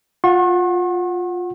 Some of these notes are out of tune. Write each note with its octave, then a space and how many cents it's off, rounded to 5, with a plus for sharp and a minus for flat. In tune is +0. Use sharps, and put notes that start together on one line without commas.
F4 +15 F#5 +0 C#6 -45